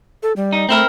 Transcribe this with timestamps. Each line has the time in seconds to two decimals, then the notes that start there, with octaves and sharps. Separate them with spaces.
0.23 A4
0.36 G3
0.53 D#4
0.69 A3 C4 E4 A#4